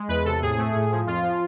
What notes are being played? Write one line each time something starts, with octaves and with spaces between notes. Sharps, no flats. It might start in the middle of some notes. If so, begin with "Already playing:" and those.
Already playing: G#3
E2 B4
C3 A4
A2 G#4
A3
A2
F3
F2 F4
F3